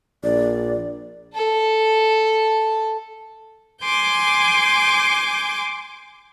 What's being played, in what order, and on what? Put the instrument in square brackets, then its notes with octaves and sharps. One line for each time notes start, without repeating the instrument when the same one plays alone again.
[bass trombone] A#1 [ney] D5
[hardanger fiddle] A4 A5
[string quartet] G#5 C6 D6 G6